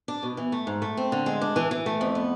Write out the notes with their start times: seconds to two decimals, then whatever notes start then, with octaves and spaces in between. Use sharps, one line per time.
0.08 D4
0.23 B2
0.37 E3
0.52 A3
0.67 G#2
0.82 A3
0.97 C4
1.12 D3
1.26 G#3
1.41 D4
1.56 E3
1.71 E3
1.86 A3
2.01 F2
2.15 B3